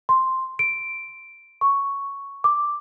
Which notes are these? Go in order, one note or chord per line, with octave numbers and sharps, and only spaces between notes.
C6
D7
C#6
D6